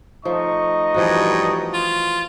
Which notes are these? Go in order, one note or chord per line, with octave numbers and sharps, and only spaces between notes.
F3 A3 D#4 D#5 C#6
G2 E3 F3 F#4
F4